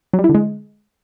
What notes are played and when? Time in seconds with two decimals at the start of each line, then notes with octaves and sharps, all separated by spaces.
0.14 F#3
0.19 G3
0.24 E4
0.29 D3
0.35 G#3